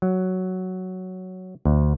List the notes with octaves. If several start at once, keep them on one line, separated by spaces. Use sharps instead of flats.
F#3
D2